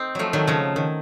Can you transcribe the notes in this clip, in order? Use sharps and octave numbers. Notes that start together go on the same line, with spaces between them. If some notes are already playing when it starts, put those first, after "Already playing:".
Already playing: C4 D#4
F3 F#3 A3
D#3 F#3
C#3 F3
D#3